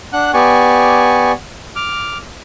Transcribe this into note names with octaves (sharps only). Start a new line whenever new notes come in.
D4 F#5 F#6
B3 G4 D5 G#5 C#6
D6 F6